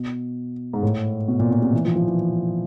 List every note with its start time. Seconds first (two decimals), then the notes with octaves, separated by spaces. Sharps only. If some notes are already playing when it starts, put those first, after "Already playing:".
Already playing: B2
0.73 G#2
0.83 A2
1.28 B2
1.40 A#2
1.51 B2
1.62 C3
1.73 E3
1.85 F3
1.96 F3
2.07 E3